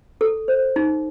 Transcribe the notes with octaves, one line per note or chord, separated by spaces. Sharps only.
A4
C5
D#4